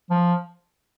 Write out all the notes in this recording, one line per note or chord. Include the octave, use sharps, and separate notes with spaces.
F3